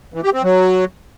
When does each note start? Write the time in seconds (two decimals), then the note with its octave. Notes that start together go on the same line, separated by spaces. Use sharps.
0.14 E3
0.23 G4
0.33 C4
0.43 F#3